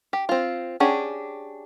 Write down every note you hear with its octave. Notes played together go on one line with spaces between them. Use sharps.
G4
C4 F4
C#4 D4 G4 G#4 F#5